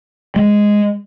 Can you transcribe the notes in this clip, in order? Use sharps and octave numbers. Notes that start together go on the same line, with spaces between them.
G#3